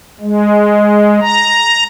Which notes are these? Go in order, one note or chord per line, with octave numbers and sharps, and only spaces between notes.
G#3
A#5